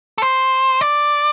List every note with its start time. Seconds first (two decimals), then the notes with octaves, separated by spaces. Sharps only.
0.18 A4
0.23 C5
0.81 D5